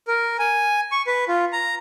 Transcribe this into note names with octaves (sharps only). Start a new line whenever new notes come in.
A#4
G#5
C#6
B4
F4
A#5